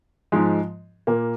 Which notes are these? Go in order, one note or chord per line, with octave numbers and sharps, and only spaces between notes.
G#2 F3 G#3
A#2 A#3